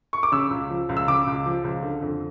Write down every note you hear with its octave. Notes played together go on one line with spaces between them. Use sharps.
C#6
D6
C#3 E6
C#2
F3
C#2
E6
C#3 D6
C#2
F3
C#2
D3
F2